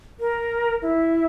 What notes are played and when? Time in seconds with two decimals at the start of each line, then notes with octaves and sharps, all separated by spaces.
0.20 A#4
0.82 E4